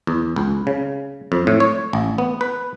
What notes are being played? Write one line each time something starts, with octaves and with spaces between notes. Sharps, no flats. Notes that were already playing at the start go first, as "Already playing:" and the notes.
E2
C#2
C#3
F2
A2
C#5
A1
B3
B4